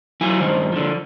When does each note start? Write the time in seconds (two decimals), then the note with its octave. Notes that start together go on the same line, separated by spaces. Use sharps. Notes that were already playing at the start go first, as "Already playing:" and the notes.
0.21 F#3 E4 F4 G#5
0.40 G2 D#3 C5
0.71 D3 F3